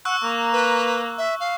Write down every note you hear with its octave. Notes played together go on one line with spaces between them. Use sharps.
F#5 C#6 E6 F#6
A#3 A#5
B4
E5
F5